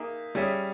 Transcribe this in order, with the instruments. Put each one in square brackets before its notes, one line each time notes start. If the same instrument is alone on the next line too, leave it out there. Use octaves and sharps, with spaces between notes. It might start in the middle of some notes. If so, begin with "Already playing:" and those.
Already playing: [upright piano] A#3 D#4 G#4 E5
G3 C#4 G#4 C#5 E5